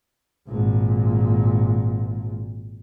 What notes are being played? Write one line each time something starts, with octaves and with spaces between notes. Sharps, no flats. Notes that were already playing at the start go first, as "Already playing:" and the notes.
G#1 A#2